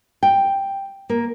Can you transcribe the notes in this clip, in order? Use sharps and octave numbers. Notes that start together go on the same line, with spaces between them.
G5
A#3